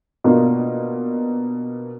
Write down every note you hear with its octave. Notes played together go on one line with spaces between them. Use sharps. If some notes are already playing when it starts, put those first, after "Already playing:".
B2 A#3 D4 F4